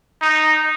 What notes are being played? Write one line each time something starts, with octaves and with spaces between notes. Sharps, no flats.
D#4